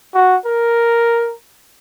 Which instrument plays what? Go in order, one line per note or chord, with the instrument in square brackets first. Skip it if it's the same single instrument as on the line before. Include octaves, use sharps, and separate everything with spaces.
[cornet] F#4
A#4